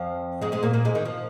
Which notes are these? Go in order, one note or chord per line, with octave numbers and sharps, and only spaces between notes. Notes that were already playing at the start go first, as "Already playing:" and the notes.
Already playing: F2 F3
G#2 G#3
G#2 G#3
A#2 A#3
A#2 A#3
G#2 G#3
D#3
F3